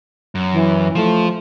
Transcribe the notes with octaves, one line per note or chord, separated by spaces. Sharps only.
F#2
E3
F3 A3